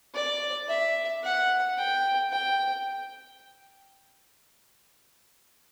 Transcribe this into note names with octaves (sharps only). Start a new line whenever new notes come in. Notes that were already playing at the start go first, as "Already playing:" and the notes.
D5
E5
F#5
G5
G5